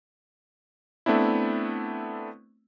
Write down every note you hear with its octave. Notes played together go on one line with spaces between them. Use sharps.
A3 B3 C4 D4 E4